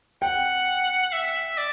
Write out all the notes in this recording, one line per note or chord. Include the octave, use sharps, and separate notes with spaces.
F#5 G5
E5
D5